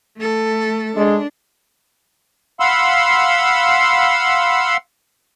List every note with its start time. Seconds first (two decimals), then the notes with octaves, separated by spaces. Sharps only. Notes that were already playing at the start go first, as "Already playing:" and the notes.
0.17 A3 A4
0.96 G#3 D4
2.60 F5 F#5 B5 C6 E6